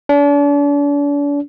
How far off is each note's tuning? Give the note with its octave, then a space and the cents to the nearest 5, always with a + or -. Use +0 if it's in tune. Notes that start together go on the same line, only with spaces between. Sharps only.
D4 -40